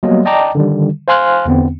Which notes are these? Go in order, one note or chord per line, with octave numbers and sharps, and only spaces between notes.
F#3 G3 A#3 B3 D#5
D5 D#5 G5 A5 A#5 D6
D3 D#3 G3
C5 F5 G#5 C6 F6 F#6
E2 D3 B3 C4